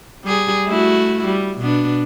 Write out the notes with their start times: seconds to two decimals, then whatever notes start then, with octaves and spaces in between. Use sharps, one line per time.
0.24 G3 G#4
0.66 A3 E4 F#4
1.25 G3
1.58 B2 B3 D4